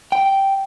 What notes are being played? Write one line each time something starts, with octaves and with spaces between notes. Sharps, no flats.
G5